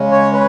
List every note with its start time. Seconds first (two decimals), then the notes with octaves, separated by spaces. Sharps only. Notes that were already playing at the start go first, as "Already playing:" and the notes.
Already playing: C#3 G#3 C#4
0.11 C#5
0.33 B4